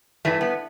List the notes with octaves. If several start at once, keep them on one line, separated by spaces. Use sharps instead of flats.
G2 E3 A3
B3